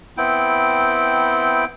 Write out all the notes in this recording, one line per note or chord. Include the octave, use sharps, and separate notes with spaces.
B3 C4 E4 G5